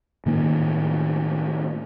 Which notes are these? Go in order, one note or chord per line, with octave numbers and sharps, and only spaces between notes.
A2 D#3 A#3